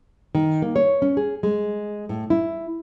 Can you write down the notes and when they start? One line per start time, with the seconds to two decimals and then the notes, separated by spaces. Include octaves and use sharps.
0.35 D#3
0.62 A#3
0.76 C#5
1.02 C#4
1.17 G#4
1.43 G#3
2.09 A2
2.30 E4